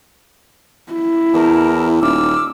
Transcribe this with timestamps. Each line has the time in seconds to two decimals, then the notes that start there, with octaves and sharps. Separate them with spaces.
0.92 E4
1.34 E2 A#4 A5
2.02 D#1 D6 E6 F6